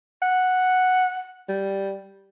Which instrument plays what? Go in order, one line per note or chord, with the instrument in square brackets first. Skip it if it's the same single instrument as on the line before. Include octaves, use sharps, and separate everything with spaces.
[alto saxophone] F#5
G3